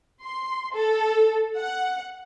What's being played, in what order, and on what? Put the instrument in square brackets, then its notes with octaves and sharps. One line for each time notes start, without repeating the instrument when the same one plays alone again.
[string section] C6
A4
F#5